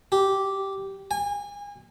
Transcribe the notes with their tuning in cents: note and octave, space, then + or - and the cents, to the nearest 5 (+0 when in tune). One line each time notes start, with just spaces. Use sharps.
G4 -10
G#5 -30